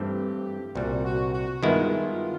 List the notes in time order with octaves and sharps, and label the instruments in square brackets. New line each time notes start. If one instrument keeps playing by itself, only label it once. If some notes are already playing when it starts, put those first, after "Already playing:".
Already playing: [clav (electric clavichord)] G2 E3 A3 C4 [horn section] G4
[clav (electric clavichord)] C2 A#2 G3 [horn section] F#4
[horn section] F#4
F#4
[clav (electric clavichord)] G2 D#3 G#3 B3 E4 [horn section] F4
[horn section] F4